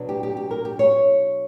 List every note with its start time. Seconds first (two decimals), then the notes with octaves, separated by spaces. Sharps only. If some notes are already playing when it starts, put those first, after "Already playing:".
Already playing: B2 F#3 B3 D4
0.09 G4
0.23 G4
0.37 G4
0.51 A#4
0.65 G4
0.79 C#5